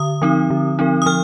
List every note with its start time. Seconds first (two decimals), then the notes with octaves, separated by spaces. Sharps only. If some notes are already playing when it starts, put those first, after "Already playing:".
Already playing: D3 D#6
0.22 F3 C4 D#4
0.50 D3
0.79 F3 C4 D#4
1.02 D#6
1.06 F3 F6